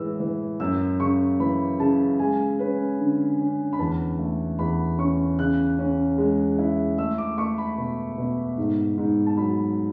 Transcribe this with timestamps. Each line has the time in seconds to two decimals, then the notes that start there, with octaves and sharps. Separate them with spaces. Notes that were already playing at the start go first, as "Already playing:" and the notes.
Already playing: A2 E3 G#3 E6
0.20 E3
0.60 F#2 E6
1.00 C#3 C#6
1.40 E3 B5
1.79 C#3 A5
2.19 G#3 G#5
2.59 C#4 B4
2.99 D3
3.39 C#4
3.73 B5
3.79 E2 A5
4.19 A3
4.59 E2 B5
4.98 C#4 C#6
5.39 C#3 F#6
5.78 C#4
6.18 G#3
6.58 E4
6.98 A3 E6
7.18 D6
7.38 A3 C#6
7.58 B5
7.78 B2
8.18 B2
8.58 G#2
8.98 G#2
9.26 A5
9.37 F#3 B5